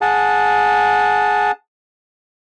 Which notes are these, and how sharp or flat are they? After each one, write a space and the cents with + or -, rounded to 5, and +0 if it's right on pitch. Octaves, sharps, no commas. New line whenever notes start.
G#4 +5 F#5 -20 A5 +0